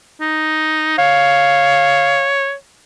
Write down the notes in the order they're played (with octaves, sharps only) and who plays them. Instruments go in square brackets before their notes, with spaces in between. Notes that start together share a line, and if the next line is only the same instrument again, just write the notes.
[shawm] D#4
[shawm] C#5 [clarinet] F5